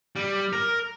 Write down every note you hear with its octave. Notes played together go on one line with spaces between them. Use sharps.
G3
A#4